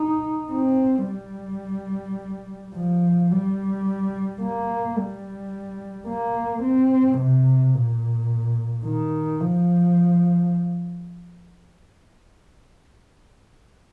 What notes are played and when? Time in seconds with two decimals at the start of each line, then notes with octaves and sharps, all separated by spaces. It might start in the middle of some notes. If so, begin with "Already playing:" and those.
Already playing: D#4
0.53 C4
1.09 G3
2.75 F3
3.31 G3
4.42 A#3
4.97 G3
6.08 A#3
6.63 C4
7.18 C3
7.74 A#2
8.85 D#3
9.40 F3